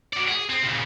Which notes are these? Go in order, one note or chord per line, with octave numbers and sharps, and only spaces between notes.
F#4 D5
G#4
C4
A#2 C#3